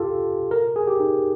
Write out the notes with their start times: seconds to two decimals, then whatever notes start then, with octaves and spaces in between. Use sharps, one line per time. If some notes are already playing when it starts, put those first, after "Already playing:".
Already playing: F4 G4 A4
0.51 A#4
0.76 G#4
0.88 G4
1.00 D#4